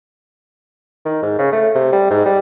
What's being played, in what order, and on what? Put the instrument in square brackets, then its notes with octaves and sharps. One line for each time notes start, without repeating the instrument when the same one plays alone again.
[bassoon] D#3
G#2
C#3
A3
C3
G3
G#2
G3